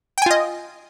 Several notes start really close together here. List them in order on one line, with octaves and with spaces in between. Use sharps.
G5 G#5 F4 D#5